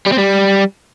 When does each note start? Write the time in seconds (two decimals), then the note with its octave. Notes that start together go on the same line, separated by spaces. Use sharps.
0.07 G3
0.13 C4
0.19 G3